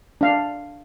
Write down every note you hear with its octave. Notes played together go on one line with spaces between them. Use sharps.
D4 F5